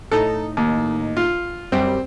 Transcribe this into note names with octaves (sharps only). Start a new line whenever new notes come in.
A2 D#4 A4
D#2
F4
F#2 G3 C4